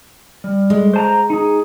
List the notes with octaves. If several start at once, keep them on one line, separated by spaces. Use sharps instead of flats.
G3
G#3
C5 A5 A#5
D#4 G#4